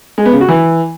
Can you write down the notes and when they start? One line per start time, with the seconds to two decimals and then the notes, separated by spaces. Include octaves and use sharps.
0.18 G#3
0.25 B3
0.33 C#3
0.41 F#4
0.49 E3